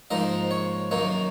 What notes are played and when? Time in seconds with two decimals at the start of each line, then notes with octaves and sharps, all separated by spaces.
0.10 G#2 F3 A#3 D#4 D#5
0.51 C#5
0.91 F#2 D#3 A#3 D#4 C#5